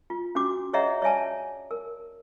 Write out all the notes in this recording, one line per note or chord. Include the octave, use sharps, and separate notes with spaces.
F4
C#4 D4 F#4 D6
G#4 C#5 D#5 E5 F#5 A#5
C#5 D5 E5 G#5 A5
A#4